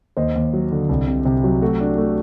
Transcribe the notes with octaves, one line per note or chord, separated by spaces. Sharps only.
D#2 C5 D#5
D#2
F#3
D3
C2
C3
C3
F#3
A3 F#4
D4
A3